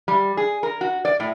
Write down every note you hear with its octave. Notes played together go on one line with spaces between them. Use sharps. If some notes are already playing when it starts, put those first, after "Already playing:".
G3
G#4
A#4
F#4
D5
A2